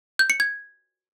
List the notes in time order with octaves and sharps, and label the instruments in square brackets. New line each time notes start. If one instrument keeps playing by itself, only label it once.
[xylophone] G6
C#7
G#6